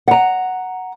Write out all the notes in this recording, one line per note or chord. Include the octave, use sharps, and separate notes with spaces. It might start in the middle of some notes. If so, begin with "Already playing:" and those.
F#5 A#5